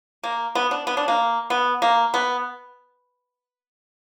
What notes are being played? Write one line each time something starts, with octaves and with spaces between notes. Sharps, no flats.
A#3
B3
D4
B3
D4
A#3
B3
A#3
B3